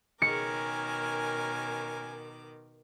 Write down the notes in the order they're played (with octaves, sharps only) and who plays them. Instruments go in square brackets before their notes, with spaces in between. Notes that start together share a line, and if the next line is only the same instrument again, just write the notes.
[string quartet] B2 D#3 D6 [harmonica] C#4 G#5 [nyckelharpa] A#4 [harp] C#7